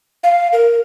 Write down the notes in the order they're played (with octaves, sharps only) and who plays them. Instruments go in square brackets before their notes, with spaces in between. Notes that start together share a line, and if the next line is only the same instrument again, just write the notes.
[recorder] F5
A#4